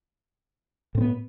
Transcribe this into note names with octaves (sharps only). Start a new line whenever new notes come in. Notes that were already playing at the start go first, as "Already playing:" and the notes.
A2 B3 C4